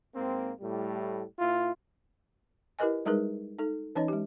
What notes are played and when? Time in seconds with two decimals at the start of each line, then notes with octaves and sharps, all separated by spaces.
0.16 G#2 A#3 C4
0.61 A2 G3
1.39 A#2 E4 F4
2.79 E4 G4 A#4 B4 D#5 G#5
3.06 G3 G#3 D#4 G#4 A#4 B4
3.59 D#4 A4
3.95 E3 C#4 D#4 C#5 D#5
4.08 G#3 G4